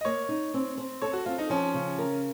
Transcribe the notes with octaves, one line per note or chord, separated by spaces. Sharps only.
D#5
A#3 C#5
D#4
C4
C4
A4 C#5
F#4
C4 F4
D#4
F3 C#4
C#3
A#4